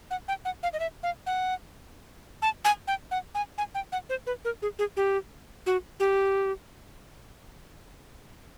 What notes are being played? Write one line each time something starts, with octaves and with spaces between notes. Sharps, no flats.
F#5
G5
F#5
F5
D#5
E5
F5
F#5
A5
G#5
G5
F#5
G#5
G#5
G5
F#5
C5
B4
A#4
G#4
G#4
G4
F#4
G4